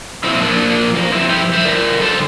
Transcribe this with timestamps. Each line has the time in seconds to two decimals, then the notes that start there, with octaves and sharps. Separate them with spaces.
0.24 A#2 F3 C4 E4
0.42 A#3 D4
0.95 G2 F3 A#3
1.12 C4 E4
1.29 E4 G4
1.53 C5 E5
1.65 G2 D3 G3 A#4 D5
2.01 A4 C5